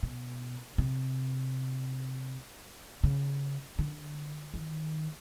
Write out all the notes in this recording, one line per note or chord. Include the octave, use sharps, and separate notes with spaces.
B2
C3
C#3
D3
D#3